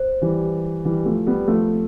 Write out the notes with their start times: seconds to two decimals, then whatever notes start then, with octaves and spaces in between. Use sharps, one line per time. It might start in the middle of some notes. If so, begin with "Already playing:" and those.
Already playing: C5
0.22 E3 G3
0.85 E3 G3
1.06 F3 A3
1.27 G3 B3
1.48 F3 A3